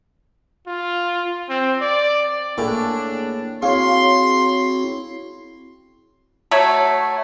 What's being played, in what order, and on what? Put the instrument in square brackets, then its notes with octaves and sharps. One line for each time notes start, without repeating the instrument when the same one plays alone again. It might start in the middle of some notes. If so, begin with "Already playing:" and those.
[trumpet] F4
C4
D5
[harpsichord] A2 [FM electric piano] A#3 G#4 [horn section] D4
[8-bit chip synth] C4 E4 F#4 [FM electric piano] G#4 C#5 [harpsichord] F5 [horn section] C6
[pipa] F#3 A3 C#5